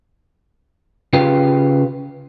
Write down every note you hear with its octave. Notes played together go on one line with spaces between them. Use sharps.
C#3 F4 G4 B4 F5 G5